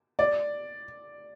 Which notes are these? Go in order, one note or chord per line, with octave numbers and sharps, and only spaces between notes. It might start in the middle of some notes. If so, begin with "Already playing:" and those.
D5